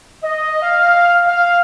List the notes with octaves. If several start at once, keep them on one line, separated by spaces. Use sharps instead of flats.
D#5
F5
F5